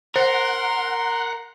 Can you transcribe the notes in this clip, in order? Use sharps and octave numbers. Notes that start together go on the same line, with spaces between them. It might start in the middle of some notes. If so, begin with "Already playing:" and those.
A#4 C5 F#5 C6